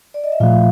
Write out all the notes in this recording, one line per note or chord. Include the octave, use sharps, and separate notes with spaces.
D5
D#5
E5
A#2 F3 A3 F4 F5